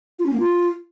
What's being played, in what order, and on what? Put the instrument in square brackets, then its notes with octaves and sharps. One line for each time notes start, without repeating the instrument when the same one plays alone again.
[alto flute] F4
C#4
A#3
F4